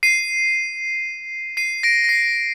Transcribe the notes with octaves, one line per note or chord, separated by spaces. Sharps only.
C7 D#7
C7 D#7
A#6 D7
A#6
C7